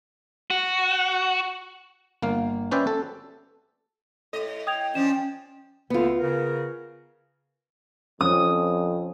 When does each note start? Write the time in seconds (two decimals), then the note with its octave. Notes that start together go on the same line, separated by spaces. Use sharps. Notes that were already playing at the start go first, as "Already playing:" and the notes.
0.50 F#4
2.22 G1 A#3 F5
2.71 C#4 B4 C5 D5 E5 G5
2.87 A4
4.33 A2 A4 D#5
4.67 G5 D#6 G#6 F7
4.95 F3 C#4 D4 E7
5.90 D2 D3 B3 F4
6.20 C#3 A#4
8.21 F2 F3 C4 C#4 D#6